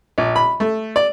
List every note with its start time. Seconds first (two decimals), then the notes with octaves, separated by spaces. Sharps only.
0.18 A#1
0.36 B5
0.60 A3
0.96 D5